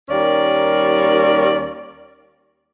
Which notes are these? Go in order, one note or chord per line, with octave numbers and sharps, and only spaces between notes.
D#2 G3 A#3 C#4 A#4 D5